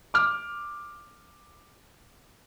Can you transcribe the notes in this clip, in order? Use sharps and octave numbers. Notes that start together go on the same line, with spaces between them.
D6 F6